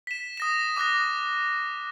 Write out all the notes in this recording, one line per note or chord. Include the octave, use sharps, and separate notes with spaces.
B6 E7
D#6 A#6 E7
D6 D#6 F#6 A#6